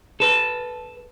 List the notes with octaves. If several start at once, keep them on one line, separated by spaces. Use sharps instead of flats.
A4 B4